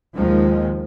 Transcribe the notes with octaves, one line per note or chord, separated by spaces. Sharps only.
D#2 D#3 F3 G#3